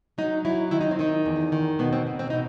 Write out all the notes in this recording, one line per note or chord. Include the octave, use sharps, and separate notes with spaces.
F#3 D#4
F#3 E4
D#3 E4
D#4
C4
D#3 D#4
E2
D#3
B2 B3
C4
B2
C4
B2 D#4